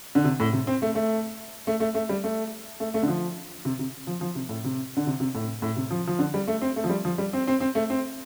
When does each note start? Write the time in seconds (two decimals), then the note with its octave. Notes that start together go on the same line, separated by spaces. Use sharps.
0.15 D3
0.24 C3
0.40 A2
0.53 C3
0.67 C4
0.82 A3
0.95 A3
1.67 A3
1.80 A3
1.94 A3
2.09 G3
2.24 A3
2.80 A3
2.94 A3
3.03 D3
3.08 F3
3.65 C3
3.79 C3
4.07 F3
4.21 F3
4.35 C3
4.49 A2
4.64 C3
4.97 D3
5.07 C3
5.20 C3
5.35 A2
5.62 A2
5.76 C3
5.91 F3
6.07 F3
6.19 D3
6.34 G3
6.48 A3
6.62 C4
6.76 A3
6.84 F3
6.90 G3
7.05 F3
7.18 G3
7.33 C4
7.47 C4
7.60 C4
7.75 A3
7.90 C4